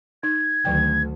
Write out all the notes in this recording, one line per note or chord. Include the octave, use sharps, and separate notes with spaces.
D#4 G#6
D2 D#3 F#3 G5